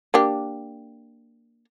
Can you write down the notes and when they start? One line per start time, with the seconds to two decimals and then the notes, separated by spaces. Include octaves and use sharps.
0.14 A#3 D4 G4